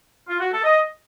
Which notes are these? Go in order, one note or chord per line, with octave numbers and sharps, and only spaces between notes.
F4
F#4
A4
D#5